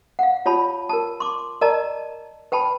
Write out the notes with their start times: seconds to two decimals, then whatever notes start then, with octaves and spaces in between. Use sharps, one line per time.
0.19 F5 F#5
0.46 F4 C#5 A5 B5
0.89 A#4 A5
1.20 C6 D6
1.61 A#4 D5 D#5 A5 A#5
2.52 B4 G5 A5 B5